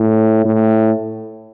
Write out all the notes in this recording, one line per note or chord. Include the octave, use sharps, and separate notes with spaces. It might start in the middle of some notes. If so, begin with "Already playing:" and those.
Already playing: A2
A2